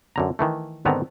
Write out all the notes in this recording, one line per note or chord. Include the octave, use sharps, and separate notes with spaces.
F#2 D3 A#5
D#3 E3 A3
G#2 D3 D#3 B3 C4 A#5